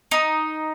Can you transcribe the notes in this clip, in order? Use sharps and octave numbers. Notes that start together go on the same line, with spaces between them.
D#4